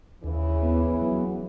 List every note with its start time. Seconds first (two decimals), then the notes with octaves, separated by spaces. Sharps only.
0.24 D#2 C#3 E3
0.63 B3
1.01 F#3